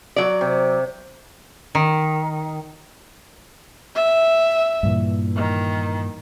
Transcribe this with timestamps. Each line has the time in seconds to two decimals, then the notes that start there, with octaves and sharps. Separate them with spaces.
0.16 F#3 D5
0.41 C3
1.75 D#3
3.95 E5
4.83 G2 A#2 E3
5.36 D#3